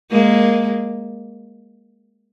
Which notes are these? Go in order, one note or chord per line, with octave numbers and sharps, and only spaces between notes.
G#3 A#3